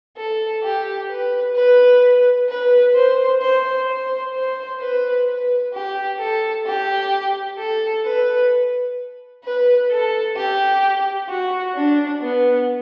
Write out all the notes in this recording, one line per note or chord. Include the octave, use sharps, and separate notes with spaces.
A4
G4
B4
B4
B4
C5
C5
C5
C5
B4
B4
G4
A4
G4
A4
B4
B4
A4
G4
F#4
D4
B3